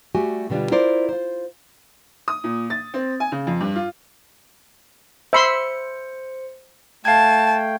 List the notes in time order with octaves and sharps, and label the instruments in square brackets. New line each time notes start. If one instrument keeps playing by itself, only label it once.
[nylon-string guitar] G3 A3 F#4 G4 G#5
B2 D3 G3 D4 F4
E4 F4 A#4 C5 D5
F4 C5
[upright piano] D#6
A#2
A6
C4
G#5
C#3
F2
G2
F4
[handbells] C5 C#7 [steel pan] E5 B5 C6
[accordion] A3 G5 [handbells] F5 G#6 [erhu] A5